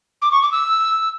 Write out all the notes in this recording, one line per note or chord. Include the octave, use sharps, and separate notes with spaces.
D6
C#6
D6
E6